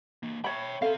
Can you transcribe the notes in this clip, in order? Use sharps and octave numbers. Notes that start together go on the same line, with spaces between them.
E3 A#3
C#5 E5 G5 B5
C4 A4 E5 F5